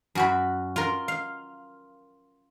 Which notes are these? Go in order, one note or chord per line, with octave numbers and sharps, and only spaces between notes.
F#2 F#4 B5
F4 A#4
F5